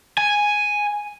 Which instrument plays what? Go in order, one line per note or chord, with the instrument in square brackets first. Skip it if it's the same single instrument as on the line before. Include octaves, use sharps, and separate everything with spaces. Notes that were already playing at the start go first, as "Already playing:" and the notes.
[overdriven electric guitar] G#5